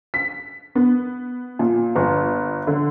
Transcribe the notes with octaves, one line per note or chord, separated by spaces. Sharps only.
B6
B3
A#2
G1
D3